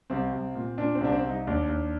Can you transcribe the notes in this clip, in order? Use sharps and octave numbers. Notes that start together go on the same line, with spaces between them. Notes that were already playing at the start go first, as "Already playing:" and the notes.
C2 C4
C2
A#2
A#2 D4
C4
C2 D4
C4
C2
D#4
D#2 D4
D#2